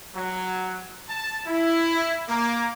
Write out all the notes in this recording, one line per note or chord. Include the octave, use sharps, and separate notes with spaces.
F#3
A5
E4
A#3